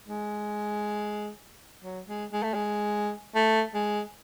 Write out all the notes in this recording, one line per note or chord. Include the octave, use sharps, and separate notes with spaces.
G#3
F#3
G#3
G#3
A3
G#3
A3
G#3